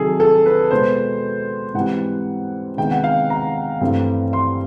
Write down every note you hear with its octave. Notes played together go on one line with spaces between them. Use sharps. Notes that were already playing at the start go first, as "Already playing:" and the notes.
Already playing: C3 D#3 F#3 G#4 A4
A4
B4
B2 G#3 B3 C5
G#2 E3 G3 C4 F#5
C3 D#3 G#3 B3 G5
F#5
F5
A#5
G2 E3 A3 C4
C6